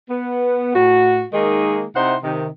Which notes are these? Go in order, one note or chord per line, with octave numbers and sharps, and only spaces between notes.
B3
A2 F#4
D#3 G#3 A#3 D#4 G#4
C3 D#4 E4 C5 F#5
C3 D#3